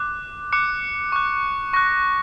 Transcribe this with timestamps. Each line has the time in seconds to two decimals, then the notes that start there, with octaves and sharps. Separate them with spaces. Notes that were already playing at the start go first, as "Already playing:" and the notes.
Already playing: D6 F#6
0.53 D6 F#6 C#7
1.12 C#6 F#6
1.73 C#6 F#6 A#6